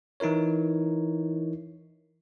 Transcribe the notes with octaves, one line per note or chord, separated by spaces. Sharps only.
E3 D#4 E4 A#4 C#5